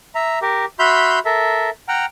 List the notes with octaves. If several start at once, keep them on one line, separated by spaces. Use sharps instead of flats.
E5 A#5
G4 A#4
F#4 E5 B5 C6 F6 G6
A4 A#4 E5
F#5 G5 A#5 F6